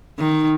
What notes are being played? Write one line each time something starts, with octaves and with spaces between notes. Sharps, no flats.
D#3